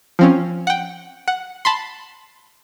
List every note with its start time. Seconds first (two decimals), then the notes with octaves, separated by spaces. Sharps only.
0.19 F3 C4 C#4
0.67 F#5 G5
1.28 F#5
1.65 A5 B5 C6